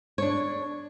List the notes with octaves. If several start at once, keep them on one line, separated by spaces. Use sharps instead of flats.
D4 C#5